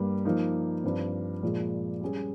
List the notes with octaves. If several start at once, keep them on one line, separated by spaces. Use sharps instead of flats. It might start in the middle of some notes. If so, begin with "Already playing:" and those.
Already playing: G2 G3 A#3
F3 A#3 D#4
G2 F3 C4
A#2 F3 G#3
G3 C#4 G#4